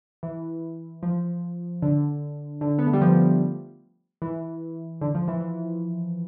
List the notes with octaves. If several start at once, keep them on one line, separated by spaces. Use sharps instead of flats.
E3
F3
D3
D3
B3
A3
G3
F3
E3
D3
F3
E3
E3